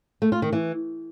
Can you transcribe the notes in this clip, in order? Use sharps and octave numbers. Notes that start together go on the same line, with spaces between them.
A3
F4
D#3
E3